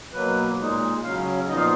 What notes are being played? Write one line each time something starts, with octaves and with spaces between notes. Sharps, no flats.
B2 F#3 A#3 B4
A#2 G#3 D#4
C#3 F#3 C#4 F5
A#2 F3 B3 D#4 D#5
F5